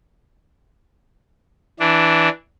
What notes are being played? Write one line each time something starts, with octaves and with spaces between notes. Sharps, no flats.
E3 D4